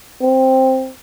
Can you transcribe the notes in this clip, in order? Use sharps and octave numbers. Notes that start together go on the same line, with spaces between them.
C4